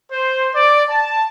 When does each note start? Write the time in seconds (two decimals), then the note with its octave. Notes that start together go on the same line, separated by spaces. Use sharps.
0.12 C5
0.54 D5
0.91 A5